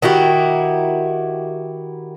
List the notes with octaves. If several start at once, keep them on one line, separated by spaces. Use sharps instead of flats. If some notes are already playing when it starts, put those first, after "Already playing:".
D#3 E4 F#4 G4